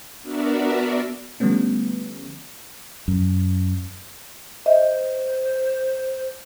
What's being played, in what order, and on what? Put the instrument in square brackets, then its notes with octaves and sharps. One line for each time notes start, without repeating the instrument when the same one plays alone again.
[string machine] B3 D4 F#4 A#4 D5 E5
[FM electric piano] D3 F3 G3 A3 B3 C#4
[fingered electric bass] F#2
[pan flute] C5 [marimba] D#5 E5